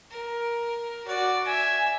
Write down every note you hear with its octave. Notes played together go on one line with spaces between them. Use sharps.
A#4
F#4 D5
E5 G#5